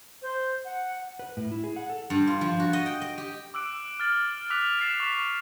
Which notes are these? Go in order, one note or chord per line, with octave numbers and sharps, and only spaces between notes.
C5
F#5
B4
A2
E4
G#4
F#5
A4
G2
F4
F3
F#4
D#5
G5
D#5
G4
D6 E6 F#6 D7
F6 A6 F#7
D6 E6 F#6 B6 F7
A6 C7 E7
C#6 B6